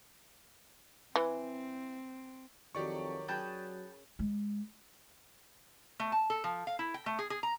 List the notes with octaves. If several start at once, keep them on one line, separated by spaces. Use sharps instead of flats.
E3 C4 B4
F2 D#3 F#3 G4 D5 C#6
F#3 C#4 G#4 B4 G5 A5
G#3
A3
A5
A4
F3
F5
E4
G5
A3
G#4
G#4
A#5